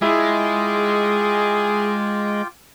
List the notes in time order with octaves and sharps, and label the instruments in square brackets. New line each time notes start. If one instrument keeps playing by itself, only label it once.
[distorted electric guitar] G#3 [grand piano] E4 [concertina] F4 G5 D6 [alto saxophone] G#4